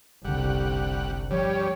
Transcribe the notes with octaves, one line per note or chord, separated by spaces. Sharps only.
F#1 C2 D3 G3 F#5
G2 F3 G3 C#5